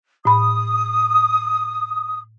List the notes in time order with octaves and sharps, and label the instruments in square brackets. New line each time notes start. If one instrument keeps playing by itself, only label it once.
[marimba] A2 B5 [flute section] D#6